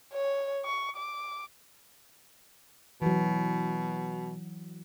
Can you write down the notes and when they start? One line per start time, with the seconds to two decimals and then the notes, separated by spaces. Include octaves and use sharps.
0.13 C#5
0.65 C#6
0.97 D6
3.02 B2 E3 F#3